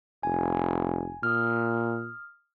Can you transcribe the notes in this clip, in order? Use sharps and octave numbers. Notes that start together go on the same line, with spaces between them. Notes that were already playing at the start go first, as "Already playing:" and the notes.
F1 G#5
A#2 D#6 F6